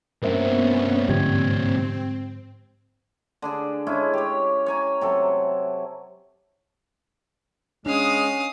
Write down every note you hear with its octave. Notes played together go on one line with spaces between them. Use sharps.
C2 G2 B3 C#4 A#4 C5 E5
G#2 D3 F3 C4 G4 G#6
D3 D4 G#4
G#3 C#4 E4 G#4
G4 C#5
C#5 G#5 A#5
C3 F#3 A4
G#3 C#4 D4 F5 D#6